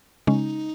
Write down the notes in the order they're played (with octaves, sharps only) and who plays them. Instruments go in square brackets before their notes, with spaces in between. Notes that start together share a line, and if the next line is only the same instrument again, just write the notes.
[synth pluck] C#3 G#3 C#4 [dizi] D#4